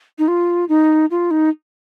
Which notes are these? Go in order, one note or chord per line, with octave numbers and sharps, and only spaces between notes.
D#4
F4
D#4
F4
D#4